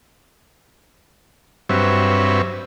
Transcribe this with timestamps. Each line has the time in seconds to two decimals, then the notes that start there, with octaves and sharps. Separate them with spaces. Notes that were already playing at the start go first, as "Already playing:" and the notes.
1.69 G2 F#3 C4 B4 C#5 E5